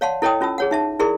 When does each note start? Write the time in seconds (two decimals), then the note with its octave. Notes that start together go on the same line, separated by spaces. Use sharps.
0.01 C#5 D5 F5 F#5 A5 C6
0.22 E4 A4 C#5 D#5 G5 D#6
0.41 C#4 F4 A5 E6
0.58 G#4 C#5 F#5
0.71 D#4 E5 A5
0.99 E4 G#4 A#4 D5 C6